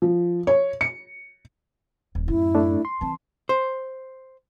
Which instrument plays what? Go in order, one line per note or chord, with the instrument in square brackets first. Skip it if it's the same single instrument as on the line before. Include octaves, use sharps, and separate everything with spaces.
[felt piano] F3
C#5
C#7
[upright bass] D#1
[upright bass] F#2 A2 [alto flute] E4
[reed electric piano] A3 D4
C6
[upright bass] E3 C4 [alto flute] A5
[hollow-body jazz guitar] C5